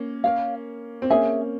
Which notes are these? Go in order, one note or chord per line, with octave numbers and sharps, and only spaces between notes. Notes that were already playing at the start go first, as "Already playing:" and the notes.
Already playing: A#3 C#4
A#4 C#5 F5
C4
A#3 C#4 G#4 E5 G#5